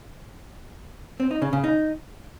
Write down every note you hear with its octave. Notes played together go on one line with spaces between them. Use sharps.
C4
D#4
C#3
C#3
D#4